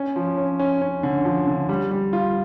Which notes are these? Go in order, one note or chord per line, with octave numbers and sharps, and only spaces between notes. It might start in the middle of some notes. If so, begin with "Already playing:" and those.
Already playing: C#4
F3
C#4
C#4
C#4
D3
F3
D3
G3
G3
F4